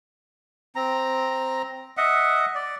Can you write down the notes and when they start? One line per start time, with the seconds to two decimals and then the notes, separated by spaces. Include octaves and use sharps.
0.75 C4 A#5
1.97 D#5 E5 F#5
2.55 D5